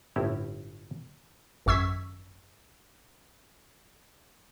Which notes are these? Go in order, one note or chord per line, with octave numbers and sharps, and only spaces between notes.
G1 A2 C4 C#4 E4 G4
G#1 F#2 C#6 E6 G#6 B6